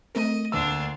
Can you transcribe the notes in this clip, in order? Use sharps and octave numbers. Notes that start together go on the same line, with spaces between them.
A3 C4 A#4 D#5
D2 A#3 D4 F4 E6